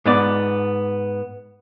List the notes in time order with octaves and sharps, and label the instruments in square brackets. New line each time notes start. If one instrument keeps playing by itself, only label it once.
[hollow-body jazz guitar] G#2 B3 D5